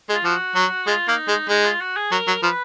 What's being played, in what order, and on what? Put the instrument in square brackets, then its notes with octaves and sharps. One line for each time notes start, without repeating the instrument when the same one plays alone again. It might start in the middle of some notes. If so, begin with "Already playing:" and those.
[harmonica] G#3
[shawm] F4
[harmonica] F3 [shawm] F#4
[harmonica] F#3
[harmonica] G#3 [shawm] F4
[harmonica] A#3 [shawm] D#4
[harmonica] G#3 [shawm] D#4
[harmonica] G#3 [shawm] D#4
[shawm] F4
F#4
G#4
[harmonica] F#3 [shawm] A#4
[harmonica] F#3
[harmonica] F3 [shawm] B4